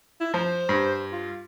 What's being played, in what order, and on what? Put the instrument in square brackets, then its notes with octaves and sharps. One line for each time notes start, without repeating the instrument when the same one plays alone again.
[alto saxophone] E4
[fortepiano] F3 [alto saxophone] C5
[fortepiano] G2
[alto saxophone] F4